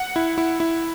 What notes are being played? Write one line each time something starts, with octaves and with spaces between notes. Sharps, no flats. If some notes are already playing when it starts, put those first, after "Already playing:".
Already playing: F#5
E4
E4
E4